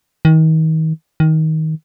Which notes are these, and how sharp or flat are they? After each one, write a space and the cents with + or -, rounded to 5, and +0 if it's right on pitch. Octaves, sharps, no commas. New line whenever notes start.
D#3 +35
D#3 +20